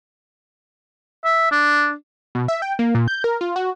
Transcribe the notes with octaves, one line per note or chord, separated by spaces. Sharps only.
E5
D4
B2
E5
G5
A#3
A#2
G6
A#4
F4
F#4